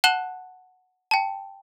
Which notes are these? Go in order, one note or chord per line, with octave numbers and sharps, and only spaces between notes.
F#5 A5 F#6 E7 F#7 G7
G5 A5